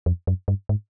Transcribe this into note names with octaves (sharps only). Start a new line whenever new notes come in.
F2
F#2
G2
G#2